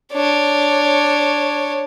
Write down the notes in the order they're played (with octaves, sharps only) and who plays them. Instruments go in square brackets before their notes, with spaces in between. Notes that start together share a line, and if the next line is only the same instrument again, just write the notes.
[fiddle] D4 C#5